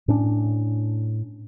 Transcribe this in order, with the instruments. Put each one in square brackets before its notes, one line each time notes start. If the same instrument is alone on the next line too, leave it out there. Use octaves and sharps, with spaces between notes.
[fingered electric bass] A2 C#4 D4